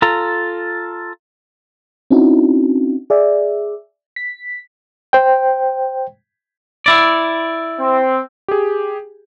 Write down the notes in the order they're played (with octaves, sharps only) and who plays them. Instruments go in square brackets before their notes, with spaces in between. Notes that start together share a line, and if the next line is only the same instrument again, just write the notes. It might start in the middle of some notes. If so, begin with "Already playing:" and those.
[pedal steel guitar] F4 A4 A#5
[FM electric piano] C4 C#4 D#4 E4 F#4
G#4 D5 E5
B6
[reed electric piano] C5 G5
[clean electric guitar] E4 D5
[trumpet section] C4
[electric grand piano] G4 G#4